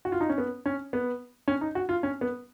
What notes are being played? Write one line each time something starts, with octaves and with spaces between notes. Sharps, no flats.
F#4
F4
D#4
C#4
B3
C#4
B3
C#4
D#4
F#4
F4
C#4
B3